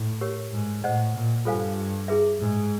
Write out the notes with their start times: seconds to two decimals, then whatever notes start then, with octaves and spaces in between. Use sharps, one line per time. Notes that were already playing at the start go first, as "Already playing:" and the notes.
Already playing: A2
0.21 G4 A#4 C#5
0.53 G#2
0.83 A2 C5 D#5 F#5
1.14 A#2
1.45 G2 F4 A4 C5 F5 G#5
2.08 E4 G#4 B4 E5
2.39 G#2